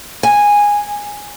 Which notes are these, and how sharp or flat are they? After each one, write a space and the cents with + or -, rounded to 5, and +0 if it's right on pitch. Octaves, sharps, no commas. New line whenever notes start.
G#5 -10